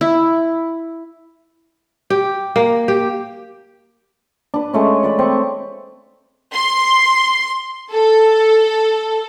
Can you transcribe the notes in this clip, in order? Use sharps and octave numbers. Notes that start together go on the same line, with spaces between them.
E4
G4
A#3
G4
D4 B4
G#3 A3 C#4
B4 D5 B5
C4 C#6
C6
A4